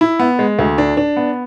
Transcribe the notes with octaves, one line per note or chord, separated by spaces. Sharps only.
E4
B3
G#3
D2
D4
D4
B3